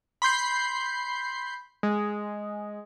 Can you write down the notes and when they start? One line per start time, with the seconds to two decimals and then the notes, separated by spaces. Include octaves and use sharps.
0.22 B5 C6 G6 C7
1.83 G#3